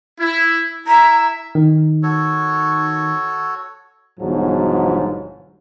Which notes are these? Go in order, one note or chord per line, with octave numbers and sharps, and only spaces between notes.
E4
E4 E5 A#5
D#3
F#4 A4 C#5
G1 E2 G#2 B2 F3 F#3